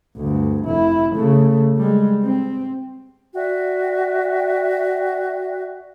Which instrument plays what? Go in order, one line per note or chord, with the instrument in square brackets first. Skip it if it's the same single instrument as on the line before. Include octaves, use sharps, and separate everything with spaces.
[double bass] D2 G2
F1 E4
C#3 A3
G3 G#3
C4
[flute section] F#4 D5 E5 G5